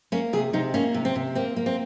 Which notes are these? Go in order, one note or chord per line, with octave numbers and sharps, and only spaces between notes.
A#3 C#4
C3 G#4
C3 D#4
A#3 C#4
C3
C4
C3
A#3 C4
A#3
C4